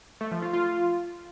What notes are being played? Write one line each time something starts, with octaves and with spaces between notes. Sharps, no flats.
A3
F3
F4
F4